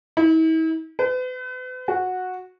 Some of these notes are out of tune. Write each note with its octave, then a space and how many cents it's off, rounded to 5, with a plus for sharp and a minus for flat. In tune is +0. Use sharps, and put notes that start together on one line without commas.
E4 -45
B4 +40
F#4 -10